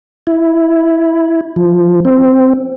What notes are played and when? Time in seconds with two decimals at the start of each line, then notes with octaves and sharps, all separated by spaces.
0.27 E4
1.56 F3
2.05 C4